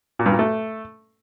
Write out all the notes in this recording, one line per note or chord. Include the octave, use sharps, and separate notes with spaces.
A#2
G2
A#2
A3